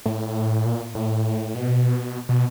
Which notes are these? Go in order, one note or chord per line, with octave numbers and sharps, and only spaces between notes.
A2
A#2
A2
B2
B2